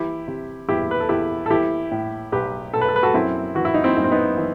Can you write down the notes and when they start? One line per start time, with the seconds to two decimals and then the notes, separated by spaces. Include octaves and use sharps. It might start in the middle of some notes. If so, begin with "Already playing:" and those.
Already playing: E3 E4 G4
0.28 C3
0.69 E2 E4 G4
0.91 B4
1.00 A4
1.09 E2 E4 G4
1.46 A4
1.50 E3 E4 G4
1.91 A2
2.32 B1 G4 B4
2.74 B1 A4
2.81 B4
2.88 A4
2.96 B4
3.03 F#4 A4
3.14 F#2 C4 E4
3.55 E3 F#4
3.65 E4
3.74 D#4
3.84 C4 E4
3.97 F#2 D#4
4.04 C4
4.11 B3 D#4
4.37 E3